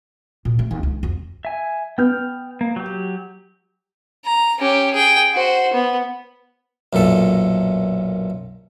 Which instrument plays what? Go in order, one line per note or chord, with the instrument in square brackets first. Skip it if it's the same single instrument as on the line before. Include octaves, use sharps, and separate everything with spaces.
[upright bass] A#2
A3
D#2
C#2
F2
[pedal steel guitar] E5 G#5
[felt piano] B3 [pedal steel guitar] G5 F6 G6
[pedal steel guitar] A#3
F#3 G4
[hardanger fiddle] A#5
C#4 G4
G#4 G5
F#4 C5
B3
[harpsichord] B1 F#2 A#2 A4